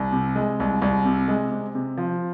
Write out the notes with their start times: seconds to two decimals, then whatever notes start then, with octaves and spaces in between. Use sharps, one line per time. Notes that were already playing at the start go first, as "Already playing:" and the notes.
Already playing: C2
0.13 C3
0.36 G#3
0.60 C2
0.82 C2
1.05 C3
1.28 G#3
1.51 C3
1.75 C3
1.97 F3